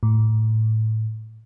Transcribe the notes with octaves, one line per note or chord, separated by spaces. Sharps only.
A2